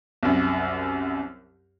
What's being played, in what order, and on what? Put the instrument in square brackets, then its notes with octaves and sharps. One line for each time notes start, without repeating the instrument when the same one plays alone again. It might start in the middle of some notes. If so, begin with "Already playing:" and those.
[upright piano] C2 F#2